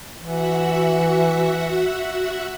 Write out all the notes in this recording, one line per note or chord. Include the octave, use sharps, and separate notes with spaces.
E3 F#4 E5 F#5